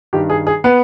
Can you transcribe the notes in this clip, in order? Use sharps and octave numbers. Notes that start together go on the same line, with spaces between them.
G2 D#3 G4
G#4
G#4
B3 B4